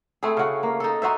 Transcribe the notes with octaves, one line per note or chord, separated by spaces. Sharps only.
A3 C4 E4 G#4
C#3 F#4
A#3
D#4 A4
D#4 F#4 C5 E5